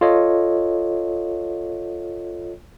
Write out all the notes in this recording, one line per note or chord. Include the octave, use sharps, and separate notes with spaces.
F4 A4 C#5 D#5